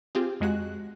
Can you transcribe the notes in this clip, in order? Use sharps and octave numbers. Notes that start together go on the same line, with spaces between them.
C4 F4 G4 G#4
F2 G#3 F#4 F#6